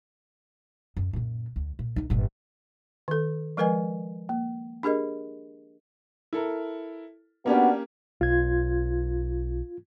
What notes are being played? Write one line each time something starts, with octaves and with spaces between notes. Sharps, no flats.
F#2
F#2 A#2
D2
A#2
D1 D#4
G1 A#2
D#3 A4
F3 G#3 A#4 B4 D#5 G#5
A#3
D4 G4 G#4 A#4 D#5
E4 A4 A#4
A#3 B3 C#4 D4 F#4 G4
B1 F4 G#6